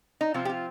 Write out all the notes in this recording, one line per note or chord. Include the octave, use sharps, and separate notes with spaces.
D#4
C3 F3 C4 F4
G4
F4